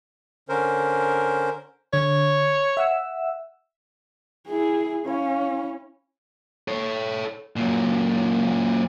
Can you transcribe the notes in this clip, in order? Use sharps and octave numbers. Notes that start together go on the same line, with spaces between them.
D3 C#4 A#4 C5
D3 C#5
E5 F#5 E6
E4 G#4
C#4 E4 C#5 F5
A4 C#5
F#2 A#2